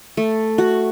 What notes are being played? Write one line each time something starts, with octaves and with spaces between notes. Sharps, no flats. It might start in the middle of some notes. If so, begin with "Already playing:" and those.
A3
F#4